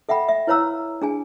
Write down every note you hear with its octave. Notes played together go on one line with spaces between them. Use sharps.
A4 E5 F#5 G5 B5
E5
E4 B4 C#5 F5 A#5 E6
D4 G#4 G#5